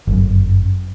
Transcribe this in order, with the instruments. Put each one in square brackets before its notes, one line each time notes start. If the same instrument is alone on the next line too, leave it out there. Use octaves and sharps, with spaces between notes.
[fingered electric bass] G1 F#2